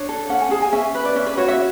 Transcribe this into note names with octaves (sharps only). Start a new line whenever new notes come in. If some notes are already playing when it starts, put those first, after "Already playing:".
Already playing: D4 C#5
A4
C#4 F#5
G#5
G#4 A5
G#5
C#4 E5
B4
D5
C#4 E5
B4
F#4 C#5
E5